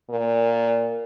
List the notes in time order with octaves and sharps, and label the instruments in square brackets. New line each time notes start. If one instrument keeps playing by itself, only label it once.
[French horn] A#2